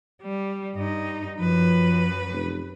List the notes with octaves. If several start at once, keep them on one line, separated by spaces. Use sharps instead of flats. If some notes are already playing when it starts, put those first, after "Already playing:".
G3
G2 D#4
F#2 F3 B4
F1